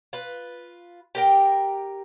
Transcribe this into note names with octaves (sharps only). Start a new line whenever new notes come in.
F4 B4
G4 A#4 G5